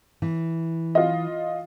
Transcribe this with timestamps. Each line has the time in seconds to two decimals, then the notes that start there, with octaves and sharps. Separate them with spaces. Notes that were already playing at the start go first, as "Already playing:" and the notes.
0.22 E3
0.95 F4 D#5